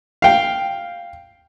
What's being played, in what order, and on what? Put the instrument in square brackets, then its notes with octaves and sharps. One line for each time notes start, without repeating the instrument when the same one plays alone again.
[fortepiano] F5 G5